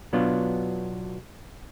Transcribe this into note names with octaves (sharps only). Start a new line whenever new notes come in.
B2 F#3 B3 D4 F4